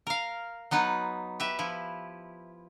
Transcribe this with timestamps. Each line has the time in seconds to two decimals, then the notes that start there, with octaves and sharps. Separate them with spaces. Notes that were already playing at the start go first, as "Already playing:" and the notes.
0.07 A#4 F5
0.71 F#3 B3 D#4 B4
1.40 G4 B4 E5
1.59 F3 E4